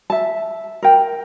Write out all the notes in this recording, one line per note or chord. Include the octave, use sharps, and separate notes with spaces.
E5 A5
A#4 G5